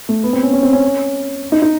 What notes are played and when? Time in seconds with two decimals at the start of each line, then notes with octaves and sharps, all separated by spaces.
0.09 A3
0.24 B3
0.33 C4
0.43 C#4
0.53 C#4
0.63 C4
0.73 C#4
1.52 D#4
1.62 D#4